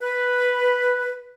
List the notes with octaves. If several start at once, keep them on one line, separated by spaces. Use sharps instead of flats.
B4